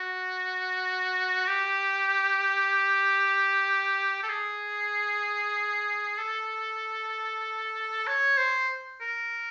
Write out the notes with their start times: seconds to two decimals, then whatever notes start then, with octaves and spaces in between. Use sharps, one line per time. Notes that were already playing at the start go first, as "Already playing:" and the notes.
Already playing: F#4
1.48 G4
4.23 A4
4.30 G#4
6.18 A4
8.07 C#5
8.38 C5
9.01 A#4